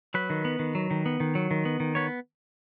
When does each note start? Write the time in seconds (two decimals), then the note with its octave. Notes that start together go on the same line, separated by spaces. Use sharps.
0.14 F#3 B4
0.30 D#3
0.45 B3
0.59 D#3
0.75 F#3
0.91 D#3
1.06 B3
1.20 D#3
1.35 F#3
1.51 D#3
1.65 B3
1.80 D#3
1.95 B3 C#5